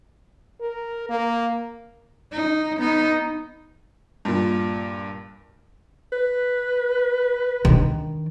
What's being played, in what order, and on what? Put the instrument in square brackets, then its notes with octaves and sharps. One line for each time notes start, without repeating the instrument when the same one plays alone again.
[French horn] A#4
A#3
[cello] D#4
B3 D#4
[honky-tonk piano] G2 A#2
[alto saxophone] B4
[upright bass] D#3 D4